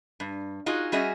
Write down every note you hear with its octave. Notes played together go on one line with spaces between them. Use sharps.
G2
D#4 F4 F#4 G#4
G3 C#4 F#4 G#4 D#5 E5